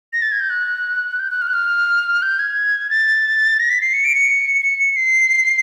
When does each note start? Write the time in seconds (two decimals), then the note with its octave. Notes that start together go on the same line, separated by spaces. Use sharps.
0.13 A#6
0.22 A6
0.32 G#6
0.40 G6
0.50 F#6
1.19 G6
1.30 F#6
1.42 F6
1.47 F#6
1.53 F6
2.22 G6
2.39 G#6
2.90 A6
3.59 A#6
3.70 B6
3.81 C7
3.93 C#7
4.04 D7
4.15 C#7
4.62 C#7
4.96 C7